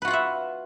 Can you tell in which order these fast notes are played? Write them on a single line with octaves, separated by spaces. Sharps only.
B4 F#4 F4 F#5 E5